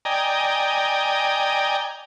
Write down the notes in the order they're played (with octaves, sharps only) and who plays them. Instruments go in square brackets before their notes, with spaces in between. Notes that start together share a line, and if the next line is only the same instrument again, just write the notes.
[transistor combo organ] D5 D#5 G5 G#5 A#5